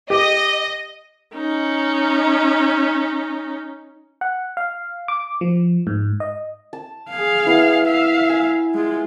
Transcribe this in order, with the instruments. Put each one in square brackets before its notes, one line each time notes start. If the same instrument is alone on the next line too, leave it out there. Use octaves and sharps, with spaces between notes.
[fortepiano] G4 [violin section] D#5
[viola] C#4 D#4
[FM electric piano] F#5
F5
D6
F3
G#2
D#5
[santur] A5
[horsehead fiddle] G#4 F5
[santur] B3 E4
[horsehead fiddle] E5 F5
[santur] G#5
[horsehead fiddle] G#3 F4